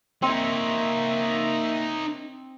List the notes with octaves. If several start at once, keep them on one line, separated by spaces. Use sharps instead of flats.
A#3 C4 D#4 C#5 E5